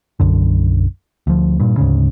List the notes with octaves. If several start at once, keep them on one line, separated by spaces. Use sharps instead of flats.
B1 F#2 D3
D2 F3
G2 A#2
D2 G#2 C#3